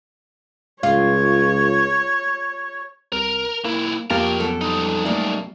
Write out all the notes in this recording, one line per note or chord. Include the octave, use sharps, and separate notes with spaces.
C#2 F4 C#5
C2 A#4
B1 A#3 E4
F2 F3 A#3 G4 A#4 F5 A5
F#2 B2 A4
G3 D#4
A3 A#3 D5